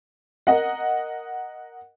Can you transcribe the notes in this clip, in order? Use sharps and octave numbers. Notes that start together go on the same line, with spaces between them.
A#4 D#5 F#5